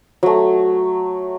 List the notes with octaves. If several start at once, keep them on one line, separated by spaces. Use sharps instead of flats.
F#3 A3